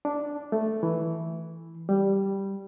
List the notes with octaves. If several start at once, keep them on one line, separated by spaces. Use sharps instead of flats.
D4
A3
E3
G3